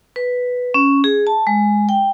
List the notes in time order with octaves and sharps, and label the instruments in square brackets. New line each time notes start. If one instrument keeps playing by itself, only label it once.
[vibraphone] B4
C#4
G#4
A5
G#3
G5